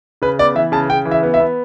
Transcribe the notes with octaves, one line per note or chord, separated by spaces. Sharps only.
C#3 B4
B3 D5
E3 E5
C#3 A5
C#3 G5
E3
E5
B3
E5
B3